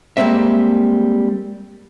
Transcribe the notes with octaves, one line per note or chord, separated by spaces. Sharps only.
G3 G#3 A#3 C4 E5